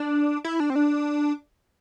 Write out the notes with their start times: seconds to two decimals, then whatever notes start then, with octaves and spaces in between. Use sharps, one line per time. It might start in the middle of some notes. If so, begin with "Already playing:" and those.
Already playing: D4
0.44 E4
0.60 D4
0.70 C4
0.76 D4